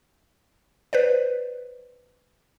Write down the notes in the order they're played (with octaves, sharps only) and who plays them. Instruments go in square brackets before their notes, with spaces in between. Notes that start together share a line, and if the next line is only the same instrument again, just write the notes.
[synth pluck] B4 C5 D5